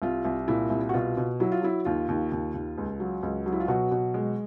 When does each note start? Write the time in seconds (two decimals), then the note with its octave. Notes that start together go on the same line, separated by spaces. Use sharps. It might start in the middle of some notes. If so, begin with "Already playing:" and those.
0.02 C2 F4
0.25 C2
0.48 A#2 E4
0.70 C2
0.89 F#4
0.94 B2 F4
1.17 B2
1.40 F#3 E4
1.52 F4
1.62 F#3 E4
1.85 D#2 F4
2.08 D#2
2.32 D#2
2.54 D#2
2.78 C#2
3.00 F#3
3.23 C#2
3.46 F#3
3.52 E4
3.60 F4
3.68 B2 F#3 F#4
3.91 B2
4.14 G#3